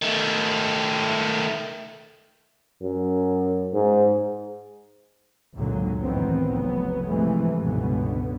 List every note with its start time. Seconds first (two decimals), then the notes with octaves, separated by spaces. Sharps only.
0.02 D#3 A3
2.82 F#2
3.73 G#2
5.55 G#1 C#2 F#2 A#2 D3 F#3
6.04 A1 E2 D#3 B3 C4
6.51 F1 C#2 F#3 B3
7.06 G#2 C3 E3 F3 G#3 A3
7.62 G1 C#2 B2 D3 B3